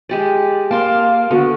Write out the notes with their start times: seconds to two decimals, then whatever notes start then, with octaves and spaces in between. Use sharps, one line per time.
0.09 G#3 G4 D5
0.71 A#3 F5 A5 C6 D6
1.31 D3 B3 F#4